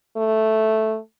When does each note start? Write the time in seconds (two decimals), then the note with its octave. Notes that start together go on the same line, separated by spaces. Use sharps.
0.17 A3